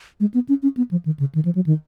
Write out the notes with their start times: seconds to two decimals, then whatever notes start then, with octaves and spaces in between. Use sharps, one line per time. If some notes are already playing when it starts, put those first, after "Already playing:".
0.20 G#3
0.34 B3
0.49 C#4
0.63 C#4
0.77 B3
0.91 F3
1.06 D#3
1.20 C#3
1.35 D#3
1.45 F3
1.55 F#3
1.66 D#3